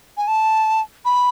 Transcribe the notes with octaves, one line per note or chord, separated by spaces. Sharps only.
G#5
A5
B5